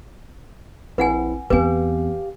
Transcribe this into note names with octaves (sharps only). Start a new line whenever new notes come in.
A#1 C4 E4 B4 F#5 G#5
E2 C4 G4 B4 F5 G#5